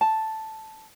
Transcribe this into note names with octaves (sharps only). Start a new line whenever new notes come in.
A5